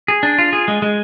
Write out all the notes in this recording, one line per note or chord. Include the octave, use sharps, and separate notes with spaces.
G#4
D4
F4
G#4
G#3
G#3